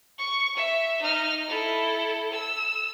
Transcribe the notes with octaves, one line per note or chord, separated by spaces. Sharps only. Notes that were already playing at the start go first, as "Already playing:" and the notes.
C#6
E5
D#4 F6
E4 A4
E6